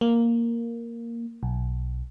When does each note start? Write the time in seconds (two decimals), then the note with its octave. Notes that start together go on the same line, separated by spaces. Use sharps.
0.01 A#3
1.43 B1